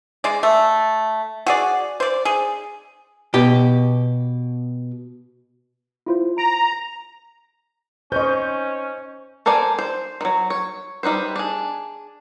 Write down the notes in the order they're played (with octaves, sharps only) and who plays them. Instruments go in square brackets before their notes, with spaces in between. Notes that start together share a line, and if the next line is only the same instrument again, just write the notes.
[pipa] G#3 D5
A3
F#4 G#4 D5
C5 D5
G#4
[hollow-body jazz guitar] B2 G4
[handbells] E4 F4 C5
[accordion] A#5 [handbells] D7
[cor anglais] C#4 [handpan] C5 D#5 [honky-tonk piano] C#6 G6
[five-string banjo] A4 A#4 C5 D5 G#5
C5
D#3 F#3
C#5
G3 D#4 B4 C5
D4 G#4